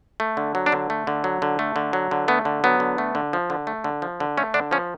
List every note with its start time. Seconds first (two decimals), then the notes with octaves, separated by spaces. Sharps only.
0.20 A3
0.37 D3
0.55 F#3
0.66 D4
0.72 D3
0.90 A3
1.07 D3
1.24 F#3
1.42 D3
1.59 A3
1.76 D3
1.93 F#3
2.11 D3
2.28 A3 B3
2.45 D3
2.64 F#3 B3
2.80 D3
2.98 A3
3.15 D3
3.33 F3
3.50 D3
3.67 A3
3.84 D3
4.02 F3
4.20 D3
4.38 A3 C#4
4.54 D3 D4
4.71 F3 C#4